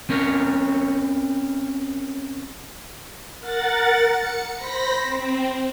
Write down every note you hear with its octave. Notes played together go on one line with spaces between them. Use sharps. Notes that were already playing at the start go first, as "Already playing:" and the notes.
C4 C#4 A#4 C#5
A#4 F#5 A6
C#7
C5 B5 A#6 B6
C4